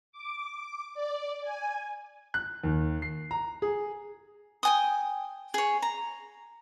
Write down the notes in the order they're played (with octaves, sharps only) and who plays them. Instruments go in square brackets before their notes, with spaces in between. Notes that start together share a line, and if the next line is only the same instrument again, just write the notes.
[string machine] D6
D5
G#5
[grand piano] F#6
D#2
C7
A#5
G#4
[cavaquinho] G5 G#5 D#6
G#4 C#5
A#5